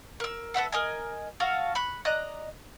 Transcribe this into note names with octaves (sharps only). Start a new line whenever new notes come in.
A#4 E6
A4 B4 E5 F#5
A#4 D#5 G#5
F4 F#4 A4 F5
B5 C#6 F#6
D5 D#5 A#5 F#6